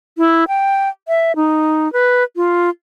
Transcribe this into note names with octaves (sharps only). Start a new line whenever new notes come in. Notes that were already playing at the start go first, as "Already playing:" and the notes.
E4
G5
E5
D#4
B4
F4